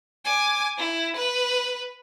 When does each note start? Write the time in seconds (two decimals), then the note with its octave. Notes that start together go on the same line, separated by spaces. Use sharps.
0.25 G#5 D6
0.78 E4
1.16 B4